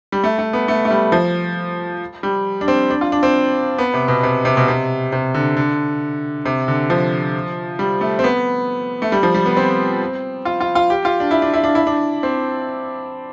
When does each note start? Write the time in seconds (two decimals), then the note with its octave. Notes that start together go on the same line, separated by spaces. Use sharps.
0.12 G3
0.24 A3
0.39 A3
0.53 B3
0.68 A3
0.85 A3
0.91 G3
1.12 F3
2.23 G3
2.61 D4
2.68 C4
2.90 D4
3.01 F4
3.12 D4
3.23 C4
3.78 B3
3.94 C3
4.08 B2
4.23 C3
4.45 C3
4.57 B2
4.68 C3
5.12 C3
5.34 D3
5.57 D3
6.46 C3
6.68 D3
6.90 F3
7.79 G3
8.01 A3
8.19 C4
8.24 B3
9.02 A3
9.12 G3
9.23 F3
9.34 G3
9.46 B3
9.57 C4
10.45 F4
10.61 F4
10.75 F4
10.90 G4
11.05 F4
11.20 D4
11.31 E4
11.42 D4
11.54 E4
11.64 D4
11.75 E4
11.87 D4
12.23 C4